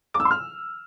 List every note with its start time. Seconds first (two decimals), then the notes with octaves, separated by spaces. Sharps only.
0.14 D6
0.20 E6
0.25 C6
0.31 F6